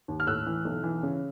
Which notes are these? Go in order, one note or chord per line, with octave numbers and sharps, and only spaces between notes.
D#2
F6
A2 E6 F#6
E3
B1
E3
C#3